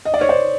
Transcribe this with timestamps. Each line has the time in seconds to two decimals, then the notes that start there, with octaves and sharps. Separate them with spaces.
0.05 D#5
0.14 D5
0.21 C#5
0.29 C5 D5